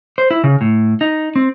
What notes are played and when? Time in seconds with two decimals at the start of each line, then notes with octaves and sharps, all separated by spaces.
0.18 C5
0.31 E4
0.44 C#3
0.61 A2
1.01 D#4
1.36 C4